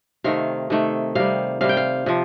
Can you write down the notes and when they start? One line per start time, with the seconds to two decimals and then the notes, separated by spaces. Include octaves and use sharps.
0.24 C3 D#3 A3 F5
0.70 C3 D#3 A3
1.15 C3 G3 F5
1.61 C3 G3 F5
1.69 G5
1.77 F5
2.06 C3 F3